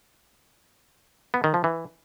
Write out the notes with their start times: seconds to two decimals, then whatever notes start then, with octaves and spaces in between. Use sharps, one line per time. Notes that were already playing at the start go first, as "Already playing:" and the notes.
1.34 B3
1.44 D#3
1.54 F3
1.64 E3